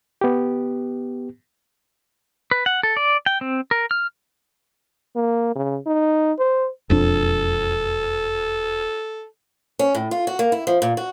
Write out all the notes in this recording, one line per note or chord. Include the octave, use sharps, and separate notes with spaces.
B3 G4
B4
F#5
A4
D5
G5
C4
A#4
F6
A#3
C#3
D#4
C5
E1 F2 D4 A4
C#4
A2
F4
F#4
A#3
E4
F3
A#2
F#4